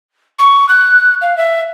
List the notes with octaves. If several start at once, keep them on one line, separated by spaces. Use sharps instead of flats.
C#6
F#6
F5
E5